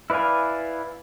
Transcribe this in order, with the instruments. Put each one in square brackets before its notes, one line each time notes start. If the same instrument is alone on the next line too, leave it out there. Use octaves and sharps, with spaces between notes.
[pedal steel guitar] E4 B4 D5 F5 G#5